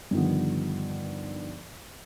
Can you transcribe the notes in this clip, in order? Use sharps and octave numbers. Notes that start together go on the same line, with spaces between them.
G2 D3 D#3 F3 B3